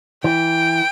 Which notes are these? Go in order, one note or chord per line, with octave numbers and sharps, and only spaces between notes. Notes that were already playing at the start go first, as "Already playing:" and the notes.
E3 G5